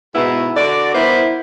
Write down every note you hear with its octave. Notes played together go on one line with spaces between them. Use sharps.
G#2 B2 B3 E4
D3 F#4 D5
B3 E4 A#4 C5